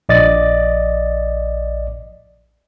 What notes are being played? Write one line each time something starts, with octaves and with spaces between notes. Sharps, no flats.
A#1 D5 D#5 A6